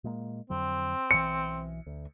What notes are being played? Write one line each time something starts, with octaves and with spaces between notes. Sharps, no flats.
A#2 G#3 A#3
F2 D3 F#3 C4
B1 E3 C#7
D2